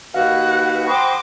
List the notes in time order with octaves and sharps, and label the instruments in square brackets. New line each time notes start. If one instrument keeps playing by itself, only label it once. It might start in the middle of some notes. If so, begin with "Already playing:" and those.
[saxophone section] D#2 D#3 F#4 [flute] B4 [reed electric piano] F5 [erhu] F#5
[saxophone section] F#4 G#4 C5 [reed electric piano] G5 B5 [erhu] D6 [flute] A#6